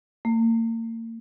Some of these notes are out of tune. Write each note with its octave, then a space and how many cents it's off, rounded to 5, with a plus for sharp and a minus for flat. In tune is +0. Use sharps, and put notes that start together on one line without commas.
A#3 -40